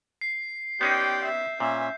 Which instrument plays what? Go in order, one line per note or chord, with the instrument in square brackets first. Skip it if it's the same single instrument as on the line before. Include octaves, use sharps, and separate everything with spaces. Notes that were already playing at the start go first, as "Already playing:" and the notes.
[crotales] C7
[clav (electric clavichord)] B3 C#4 D#4 [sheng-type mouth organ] G4 D5 C6 [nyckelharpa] G5 [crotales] G6
[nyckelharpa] E5
[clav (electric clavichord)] A#2 [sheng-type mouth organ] C#4 [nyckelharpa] E5